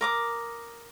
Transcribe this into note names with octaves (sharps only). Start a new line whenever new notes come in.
A#4 D6 D#6